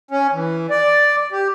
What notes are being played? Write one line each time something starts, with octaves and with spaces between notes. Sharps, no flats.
C#4
E3
D5
G4